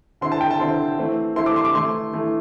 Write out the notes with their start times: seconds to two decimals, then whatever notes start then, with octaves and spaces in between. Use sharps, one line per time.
0.21 D3 C4 E4 C6
0.32 A5
0.41 G5
0.51 A5
0.60 D3 C4 E4 C6
0.99 E3 A3 C4 E4
1.36 E3 A3 C4 E4 C6
1.46 D6
1.56 C6
1.65 D6
1.75 E3 A3 E4 C6
2.13 E3 A3 E4